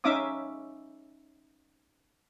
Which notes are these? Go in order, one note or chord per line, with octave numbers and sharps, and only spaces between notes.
C#4 D#4 E5 F5 D6 D#6